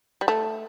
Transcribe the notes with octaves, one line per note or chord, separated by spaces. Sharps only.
G3
A3